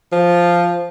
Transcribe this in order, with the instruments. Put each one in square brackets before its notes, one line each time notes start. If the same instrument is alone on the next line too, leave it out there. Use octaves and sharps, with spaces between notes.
[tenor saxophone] F3